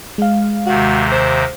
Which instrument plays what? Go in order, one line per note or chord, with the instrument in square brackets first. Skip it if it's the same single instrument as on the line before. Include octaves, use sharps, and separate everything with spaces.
[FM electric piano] G#3 F5
[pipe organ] D#2 C3 D#3 [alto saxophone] F#4
[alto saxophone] C5